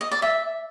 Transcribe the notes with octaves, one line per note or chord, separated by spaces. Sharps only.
D#5
D5
E5